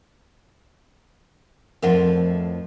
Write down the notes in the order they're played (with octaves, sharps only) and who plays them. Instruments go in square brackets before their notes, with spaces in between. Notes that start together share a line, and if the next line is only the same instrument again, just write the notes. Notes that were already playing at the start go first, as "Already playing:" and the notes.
[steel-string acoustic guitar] F2 A2 F3 [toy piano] A#4 E5 F#5